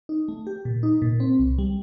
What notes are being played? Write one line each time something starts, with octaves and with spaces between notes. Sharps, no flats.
D#4
A3
G4
A#2
D#4
A#2
C4
C2
G3